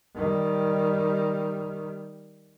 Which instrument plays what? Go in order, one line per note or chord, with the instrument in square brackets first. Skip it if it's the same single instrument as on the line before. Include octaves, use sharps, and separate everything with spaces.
[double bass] D#3 G3